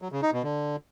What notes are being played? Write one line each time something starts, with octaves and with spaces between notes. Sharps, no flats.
F#3
C#3
D#4
B2
D3